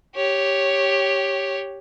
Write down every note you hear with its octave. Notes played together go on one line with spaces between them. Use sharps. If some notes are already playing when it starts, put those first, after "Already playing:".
G4 C#5